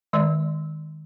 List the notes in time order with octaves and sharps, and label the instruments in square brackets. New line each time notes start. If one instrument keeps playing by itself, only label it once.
[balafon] D#3 G#3 D5